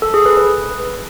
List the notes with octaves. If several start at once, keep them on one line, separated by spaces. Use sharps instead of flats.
A4
G#4
B4
B4